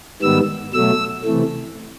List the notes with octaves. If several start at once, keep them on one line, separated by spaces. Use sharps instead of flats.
G#2 D#3 G3 B3 E6
B2 F#3 A3 E6
C3 E3 A3